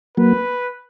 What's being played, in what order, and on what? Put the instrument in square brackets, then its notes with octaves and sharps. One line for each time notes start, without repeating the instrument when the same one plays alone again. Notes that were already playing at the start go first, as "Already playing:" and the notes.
[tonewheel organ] F#3 A#3 [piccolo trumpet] B4